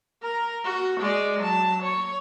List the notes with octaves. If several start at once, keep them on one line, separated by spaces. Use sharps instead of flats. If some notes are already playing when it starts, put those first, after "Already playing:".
A#4 A#5
F#4
G#3 D5
F#3 A5
C#5